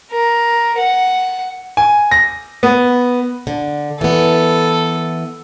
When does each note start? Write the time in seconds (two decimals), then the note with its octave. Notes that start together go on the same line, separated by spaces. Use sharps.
0.11 A#4
0.77 F#5
1.77 G#5
2.11 A#6
2.63 B3
3.47 D3
4.01 E3 B3 A4